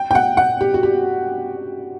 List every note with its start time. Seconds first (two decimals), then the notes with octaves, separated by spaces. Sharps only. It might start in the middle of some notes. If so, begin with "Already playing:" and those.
Already playing: G5
0.11 G5
0.15 F#5
0.37 F#5
0.61 G4
0.74 F#4
0.83 G4